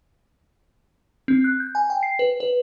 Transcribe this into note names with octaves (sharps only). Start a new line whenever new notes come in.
C4
F#6
G6
G#5
G5
C7
B4
B4